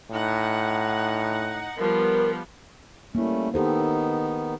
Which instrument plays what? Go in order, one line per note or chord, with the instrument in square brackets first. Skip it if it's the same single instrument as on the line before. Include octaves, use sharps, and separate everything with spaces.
[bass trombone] A2 [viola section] D#4 F#5
[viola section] F3 G3 B3 [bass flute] A#4
[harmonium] G3 A3 C#4 [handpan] A#3 E4
[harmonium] D#3 B3 D#4 [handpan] G4 A4 C5